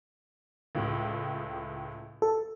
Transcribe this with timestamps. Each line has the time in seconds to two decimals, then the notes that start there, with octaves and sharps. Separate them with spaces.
0.75 C#2 A2
2.22 A4